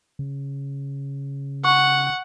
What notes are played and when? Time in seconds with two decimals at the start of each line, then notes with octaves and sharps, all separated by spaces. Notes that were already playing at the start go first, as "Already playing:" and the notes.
0.19 C#3
1.64 F#5 C#6